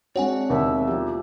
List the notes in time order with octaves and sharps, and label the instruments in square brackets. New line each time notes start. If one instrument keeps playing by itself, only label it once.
[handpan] G#3 D4 F#4 [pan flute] C4 [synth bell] C#5 F#5 G#5
[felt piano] D#2 [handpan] B2 E5
[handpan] F3 E4 G4